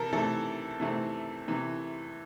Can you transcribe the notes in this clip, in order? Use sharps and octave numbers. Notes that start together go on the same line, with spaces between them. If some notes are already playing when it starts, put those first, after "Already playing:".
Already playing: C3 E3 C4 A4 A#4
C3 E3 A3 C4 A4
C3 E3 A3 C4
C3 E3